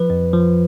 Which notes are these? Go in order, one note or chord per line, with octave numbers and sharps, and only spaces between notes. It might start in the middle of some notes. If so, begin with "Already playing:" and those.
Already playing: F3 B4
F2
F3